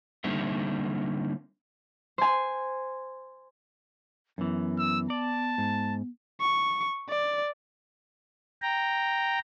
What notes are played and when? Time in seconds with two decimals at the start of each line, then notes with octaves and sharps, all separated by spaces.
0.24 D3 G3 A#3 C4 D#4 E5
2.18 C5 G#5
4.38 F#2 E3 B3
4.78 E6
5.10 D5 A5
5.58 G#2
6.41 C#6
7.09 D5
8.62 G5 A#5